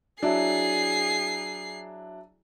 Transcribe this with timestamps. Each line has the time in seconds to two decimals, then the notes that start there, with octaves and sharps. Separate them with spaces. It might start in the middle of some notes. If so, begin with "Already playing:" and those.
0.22 F#3 D4 E4 G#4 C7